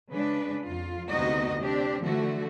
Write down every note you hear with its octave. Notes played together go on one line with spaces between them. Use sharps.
C#3 G#3 D4 B4
F2 F4
D2 C3 B3 D#4 F#4 D#5
C4 D4 G4
D3 E3 F3 A3 F#4